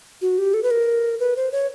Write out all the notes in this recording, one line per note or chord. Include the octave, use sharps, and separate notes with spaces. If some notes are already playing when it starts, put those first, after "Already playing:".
F#4
G4
A4
B4
A#4
B4
C5
C#5